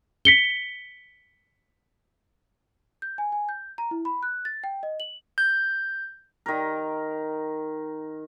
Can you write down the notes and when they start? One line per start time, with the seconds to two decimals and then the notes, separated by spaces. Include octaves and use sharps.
0.25 B6 C#7 G7
3.02 G6
3.18 G#5
3.32 G#5
3.49 G6
3.78 A#5
3.91 E4
4.05 B5
4.23 F#6
4.45 A6
4.64 G5
4.83 D#5
5.00 F#7
5.38 G6
6.46 D#3 A#4